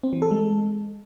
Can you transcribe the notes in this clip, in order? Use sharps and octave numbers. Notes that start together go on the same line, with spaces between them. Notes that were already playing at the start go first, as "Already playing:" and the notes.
C4
E3
A4
G#3